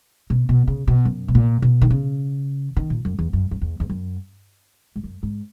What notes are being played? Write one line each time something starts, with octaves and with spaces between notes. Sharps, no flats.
B2
B2
C#3
B2
F#2
B2
A#2
B2
D#3
C#3
D#3
A#2
F#2
E2
F#2
F#2
E2
E2
F#2
G#2
F#2
G#2